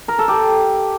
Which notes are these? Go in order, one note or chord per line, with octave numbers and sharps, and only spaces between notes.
A#4
A4
G4